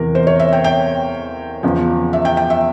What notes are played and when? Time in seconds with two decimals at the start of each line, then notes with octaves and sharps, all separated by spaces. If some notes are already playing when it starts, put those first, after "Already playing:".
Already playing: E2 C3 E3 A#4
0.15 C5
0.27 C#5
0.40 E5
0.53 G5
0.64 G5
1.63 E2 C#3 F3
2.13 E5
2.25 G5
2.37 G5
2.50 E5